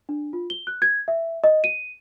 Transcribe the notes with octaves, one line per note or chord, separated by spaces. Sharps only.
D4
F4
G7
F#6
G#6
E5
D#5
D#7